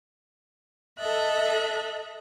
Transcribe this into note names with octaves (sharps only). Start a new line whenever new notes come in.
A4 D#5 E5 F#6